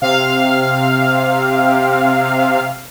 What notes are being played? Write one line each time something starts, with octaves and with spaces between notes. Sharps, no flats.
C3 F5